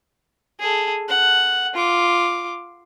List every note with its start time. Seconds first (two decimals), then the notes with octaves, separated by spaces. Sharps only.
0.60 G#4 A4
1.09 F#5
1.74 F4 D6